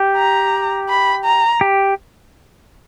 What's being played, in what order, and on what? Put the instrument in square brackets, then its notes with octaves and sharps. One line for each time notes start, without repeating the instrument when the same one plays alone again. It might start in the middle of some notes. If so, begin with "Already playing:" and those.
Already playing: [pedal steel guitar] G4
[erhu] A#5
B5
A#5
[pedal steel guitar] G4